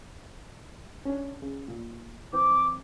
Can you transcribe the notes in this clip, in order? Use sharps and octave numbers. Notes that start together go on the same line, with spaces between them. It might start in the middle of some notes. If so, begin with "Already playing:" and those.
C#4 D4
C#3
A#2
E3 C4 D6